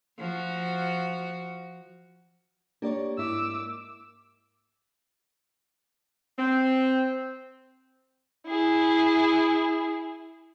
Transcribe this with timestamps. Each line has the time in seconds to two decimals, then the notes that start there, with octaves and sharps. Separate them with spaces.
0.19 F3 F#4
2.82 A#3 D4 G4 C#5 D5
3.18 G#2 E4 D6 E6
6.39 C4
8.47 E4 G#4